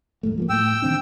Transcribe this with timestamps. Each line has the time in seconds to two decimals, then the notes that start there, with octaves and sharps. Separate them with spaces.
0.23 D#1 G#2 A3
0.38 F3 G3 A#3
0.49 A2 G5 E6
0.82 D#3 C4 D4